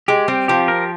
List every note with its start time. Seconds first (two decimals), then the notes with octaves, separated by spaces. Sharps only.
0.08 G#3 G4
0.28 G3 C4
0.48 F3 G4
0.68 A#4